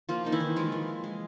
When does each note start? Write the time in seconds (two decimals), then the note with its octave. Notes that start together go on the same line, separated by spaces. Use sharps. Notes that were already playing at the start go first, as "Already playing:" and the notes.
0.09 F3 A#3 F4
0.25 A#3 D#4
0.32 E3 E4
0.40 D#3
0.56 F3 G#3 F4
0.72 E3
0.88 E3
1.04 G#3